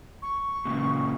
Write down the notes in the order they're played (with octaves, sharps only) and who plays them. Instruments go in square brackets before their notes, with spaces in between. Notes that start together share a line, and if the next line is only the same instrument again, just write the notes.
[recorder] C#6
[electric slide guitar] A#2 C#3